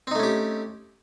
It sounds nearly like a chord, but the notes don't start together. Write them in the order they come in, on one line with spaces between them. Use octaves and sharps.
C4 D#4 A3 C#4 G4